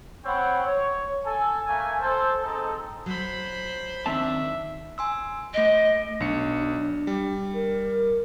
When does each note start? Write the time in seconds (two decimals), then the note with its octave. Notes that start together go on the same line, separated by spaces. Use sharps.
0.25 C4 C#5 F#5 G5 B5
0.65 C#5
1.25 A4 G#5
1.66 A3 A#3 E5 G#5
2.01 A4 C5
2.42 C4 D#4 G#4 A4
3.06 F#3 C5 B5
4.06 D#3 C4 D4 E5 A5
4.98 G#5 C6 E6
5.54 A3 D#5 D7
6.20 B1 D4 C#7
7.07 G3
7.54 A#4